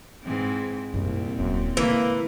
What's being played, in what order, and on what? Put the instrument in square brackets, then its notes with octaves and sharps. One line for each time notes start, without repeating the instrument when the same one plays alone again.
[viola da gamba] G#2 E3 C4
[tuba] C2 [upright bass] F#2 D#4 [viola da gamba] A#2 C4
[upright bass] D#1 E4 [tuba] F#2
[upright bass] D3 G#3 [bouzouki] E3 [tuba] A#3